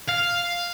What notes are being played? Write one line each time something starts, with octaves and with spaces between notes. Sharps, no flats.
F5